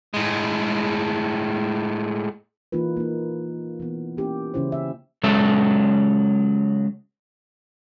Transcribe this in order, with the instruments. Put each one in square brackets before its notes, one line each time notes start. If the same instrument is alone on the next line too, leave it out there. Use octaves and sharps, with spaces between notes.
[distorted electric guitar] A2 G#3
[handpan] E3 A#3 D#4 F4 B4
A#3 D#4
E3 B3
A#3 C#4 E4 G4
C#3 E3 C#4 E4 C5
E5
[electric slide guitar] C#3 F#3 G#3 A4 E5